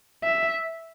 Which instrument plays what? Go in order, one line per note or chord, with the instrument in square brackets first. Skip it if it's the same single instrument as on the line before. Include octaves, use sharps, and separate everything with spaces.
[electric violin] E5